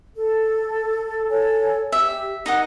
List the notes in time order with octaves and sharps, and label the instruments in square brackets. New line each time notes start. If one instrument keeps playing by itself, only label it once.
[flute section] A4
A4 C#5 G#5
[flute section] G4 [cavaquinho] E5
[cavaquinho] D#4 D#5 F#5 [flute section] A#4